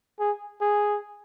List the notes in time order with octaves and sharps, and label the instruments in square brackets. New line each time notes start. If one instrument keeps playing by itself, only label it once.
[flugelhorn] G#4
G#4